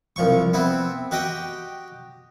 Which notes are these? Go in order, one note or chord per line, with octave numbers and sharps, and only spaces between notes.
C2 F3 C#6
B3 C4 E4
F#4 G4 D#5 G5